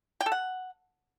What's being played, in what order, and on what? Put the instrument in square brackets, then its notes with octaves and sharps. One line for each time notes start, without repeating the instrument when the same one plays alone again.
[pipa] G5
A4
F#5